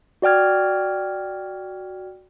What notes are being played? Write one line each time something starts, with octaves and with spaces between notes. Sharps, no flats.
F#4 D5 G5 F6 G#6